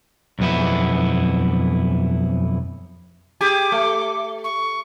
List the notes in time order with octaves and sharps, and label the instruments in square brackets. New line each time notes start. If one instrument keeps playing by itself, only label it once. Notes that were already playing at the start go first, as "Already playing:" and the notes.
[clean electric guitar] B1 F2 B3 E4
[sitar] G4 G#4 [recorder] D6
[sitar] A3
[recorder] C#6